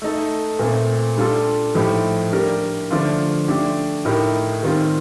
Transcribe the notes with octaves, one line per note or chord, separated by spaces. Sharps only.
A3 D#4 A4
A#2 A3 C4
G3 D4 F4 A4
A2 F3 A3 D#4 G4
G3 D4 G4 A#4
D3 F3 A3 D4 F4
A3 D4 G4
A2 A3 D#4 G4 A#4
D#3 G3 C4 F4